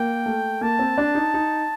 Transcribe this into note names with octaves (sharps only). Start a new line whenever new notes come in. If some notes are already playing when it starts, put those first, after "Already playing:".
Already playing: A#3 G5
A3
A#3 A5
C4
D4
D#4
D#4